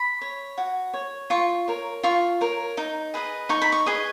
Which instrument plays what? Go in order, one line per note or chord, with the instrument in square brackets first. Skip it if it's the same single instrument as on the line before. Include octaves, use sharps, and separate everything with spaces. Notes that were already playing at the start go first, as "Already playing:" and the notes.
Already playing: [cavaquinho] B5
C#5
F#4
C#5
F4 C#6
A#4 C#5
F4 C#6
A#4 C#5
D#4
G#4 B4 D#5
D#4 C#6
B5
C#6
G#4 B4 D#5